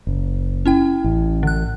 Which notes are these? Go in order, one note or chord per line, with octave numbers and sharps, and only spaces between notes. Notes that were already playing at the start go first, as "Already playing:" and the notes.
F#1
C#4 E4 G5
A1
D3 F#6